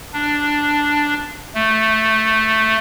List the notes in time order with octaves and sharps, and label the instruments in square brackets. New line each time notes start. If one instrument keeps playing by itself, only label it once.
[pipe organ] D4
A3